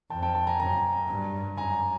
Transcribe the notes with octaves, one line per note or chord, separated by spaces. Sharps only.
F2 G5 A5
G5 A5
G5 A5
G#5 A#5
F#2 G#5 A#5
G2
F#2 G#5 A#5